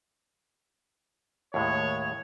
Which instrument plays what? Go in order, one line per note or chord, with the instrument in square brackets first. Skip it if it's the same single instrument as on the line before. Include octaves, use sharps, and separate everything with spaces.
[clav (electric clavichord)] D#2 A2 G#3 [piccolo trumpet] C#5